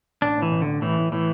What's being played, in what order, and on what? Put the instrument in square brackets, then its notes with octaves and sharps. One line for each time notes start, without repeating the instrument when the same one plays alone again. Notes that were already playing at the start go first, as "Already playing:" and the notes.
[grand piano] A1 [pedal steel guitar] D4
[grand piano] A2
[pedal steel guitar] E3
[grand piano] A1
[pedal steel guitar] D3
[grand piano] A1
[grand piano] A2 [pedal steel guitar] E3
[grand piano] A2
[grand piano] A2 [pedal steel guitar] E3